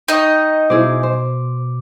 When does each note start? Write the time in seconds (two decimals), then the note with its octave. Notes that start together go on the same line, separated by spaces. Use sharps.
0.08 D#4 D#5 G5 C#6
0.70 B2 E4 G#4 C5 D6
1.03 C5